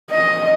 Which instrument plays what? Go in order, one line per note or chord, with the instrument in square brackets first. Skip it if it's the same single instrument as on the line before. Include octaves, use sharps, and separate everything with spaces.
[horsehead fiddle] D#5